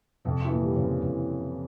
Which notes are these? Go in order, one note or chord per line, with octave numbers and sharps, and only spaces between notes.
F2 C3
E3
A#2
G3
C#3
C4
F2 E3